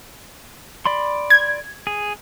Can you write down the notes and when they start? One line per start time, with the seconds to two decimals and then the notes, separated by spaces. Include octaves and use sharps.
0.86 D5 B5 C6
1.30 G#6
1.87 G#4